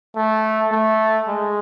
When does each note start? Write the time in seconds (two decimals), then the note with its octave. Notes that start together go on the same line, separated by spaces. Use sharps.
0.17 A3
0.72 A3
1.28 G#3